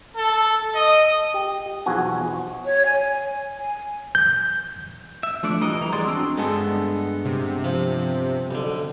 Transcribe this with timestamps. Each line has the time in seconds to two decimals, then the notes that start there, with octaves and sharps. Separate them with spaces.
0.16 A4
0.75 D#5
1.34 G4
1.86 B1 E2 F3 F#4 G#5
2.66 C#5
2.86 G#5
3.59 G#5
4.15 G6
5.23 E5
5.43 F3 A3 D4 D5
5.61 E3 G3 A#4 D#5
5.81 E3 A#5
5.92 G#3 F#4 G#4 D5 C6
6.07 C4 D4 F#4 E6
6.38 G2 G#3 B3 A4
7.25 C3
7.64 F3
8.51 B1 D3